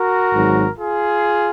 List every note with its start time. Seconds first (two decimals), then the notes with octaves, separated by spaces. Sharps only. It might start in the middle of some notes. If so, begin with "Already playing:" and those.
Already playing: F#4 A#4
0.33 G#1 G#2 F#3
0.79 F4 G#4